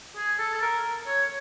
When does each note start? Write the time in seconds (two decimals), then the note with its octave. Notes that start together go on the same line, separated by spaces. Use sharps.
0.16 G#4
0.39 A4
0.54 A4
0.61 A#4
1.07 C#5